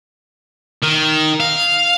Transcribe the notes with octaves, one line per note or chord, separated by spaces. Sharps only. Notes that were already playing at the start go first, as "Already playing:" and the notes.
D#3
F5